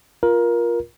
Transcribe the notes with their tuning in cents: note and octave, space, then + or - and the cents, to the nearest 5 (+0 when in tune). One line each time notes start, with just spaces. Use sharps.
F4 +0 A#4 +20